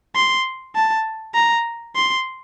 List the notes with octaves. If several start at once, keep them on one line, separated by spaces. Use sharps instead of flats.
C6
A5
A#5
C6